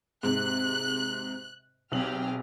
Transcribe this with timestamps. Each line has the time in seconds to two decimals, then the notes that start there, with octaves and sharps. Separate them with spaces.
0.23 G#2 C3 F#6
1.92 B1 C3 G4 G#4 F6 F#7